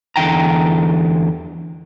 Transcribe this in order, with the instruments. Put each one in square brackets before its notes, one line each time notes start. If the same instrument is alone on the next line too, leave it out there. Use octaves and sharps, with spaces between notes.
[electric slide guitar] E2 D3 E3 G5 A#5